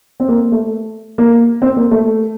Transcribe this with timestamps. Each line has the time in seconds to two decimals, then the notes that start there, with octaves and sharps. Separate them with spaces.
0.20 C4
0.28 A#3
0.52 A3
1.18 A#3
1.62 C4
1.77 A#3
1.91 A3